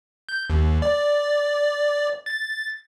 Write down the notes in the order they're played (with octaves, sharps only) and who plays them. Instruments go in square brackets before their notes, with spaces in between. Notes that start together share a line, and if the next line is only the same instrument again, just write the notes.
[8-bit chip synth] G6
D#2
D5
A6